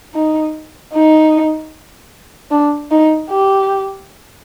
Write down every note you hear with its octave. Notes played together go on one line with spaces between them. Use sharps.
D#4
D#4
D4
D#4
G4